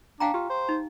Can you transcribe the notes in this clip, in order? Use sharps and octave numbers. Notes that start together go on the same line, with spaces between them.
D4 F5 G5 A#5
F4 G4
C5
D#4